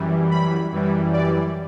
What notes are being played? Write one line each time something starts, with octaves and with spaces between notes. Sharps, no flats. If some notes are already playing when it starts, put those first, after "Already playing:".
Already playing: F#2 E3 G3
B5
F#2 E3 G3
D5